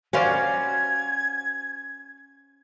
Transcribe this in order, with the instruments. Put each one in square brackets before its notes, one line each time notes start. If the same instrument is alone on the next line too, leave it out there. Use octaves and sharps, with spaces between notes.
[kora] C#4 B4 D5 [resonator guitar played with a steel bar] F#4 C5 F5 [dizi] G#6